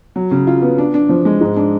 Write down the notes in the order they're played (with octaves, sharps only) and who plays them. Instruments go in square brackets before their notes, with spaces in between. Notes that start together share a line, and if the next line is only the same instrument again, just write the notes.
[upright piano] F#3
C#3
F4
B3
D4
D4
F3
G#3
G#2
D4